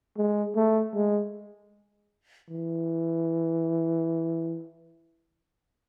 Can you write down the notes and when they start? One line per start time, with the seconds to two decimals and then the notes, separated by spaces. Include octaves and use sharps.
0.17 G#3
0.56 A3
0.94 G#3
2.50 E3